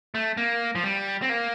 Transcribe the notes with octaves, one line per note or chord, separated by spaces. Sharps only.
A3
A#3
F3
G3
C4
A#3